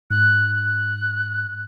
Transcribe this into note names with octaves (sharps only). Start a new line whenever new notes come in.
G#2 F#6
F#6